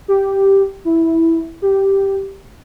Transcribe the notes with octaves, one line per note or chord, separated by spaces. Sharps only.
G4
E4
G4